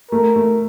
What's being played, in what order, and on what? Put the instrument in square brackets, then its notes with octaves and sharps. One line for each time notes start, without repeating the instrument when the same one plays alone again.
[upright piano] A3 [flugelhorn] A#4
[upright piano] A3